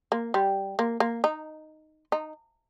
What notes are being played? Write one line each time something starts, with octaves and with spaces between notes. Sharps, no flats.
A#3
G3
A#3
A#3
D#4
D#4